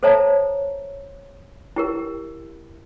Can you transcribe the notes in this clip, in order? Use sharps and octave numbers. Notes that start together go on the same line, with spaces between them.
A4 C5 C#5 E5 A5 A#5
E4 G4 A#4